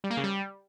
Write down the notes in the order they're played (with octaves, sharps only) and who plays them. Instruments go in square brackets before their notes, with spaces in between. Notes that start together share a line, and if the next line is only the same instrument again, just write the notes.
[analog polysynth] G3
A#3
C#3
G3